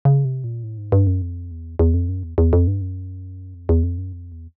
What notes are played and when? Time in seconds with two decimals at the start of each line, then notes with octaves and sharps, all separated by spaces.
0.05 C#3
0.25 C3
0.44 A#2
0.63 A2
0.78 G#2
0.92 G2
1.07 F#2
1.22 F2
1.51 E2
1.79 E2
1.94 F2
2.09 F#2
2.23 E2
2.38 E2
2.53 F2
2.67 G2
2.81 F#2
3.54 F2
3.69 E2
3.83 F2
3.98 F#2
4.13 F2
4.32 E2